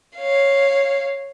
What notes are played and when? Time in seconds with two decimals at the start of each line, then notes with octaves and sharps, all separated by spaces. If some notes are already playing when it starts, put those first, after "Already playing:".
0.16 C#5 F5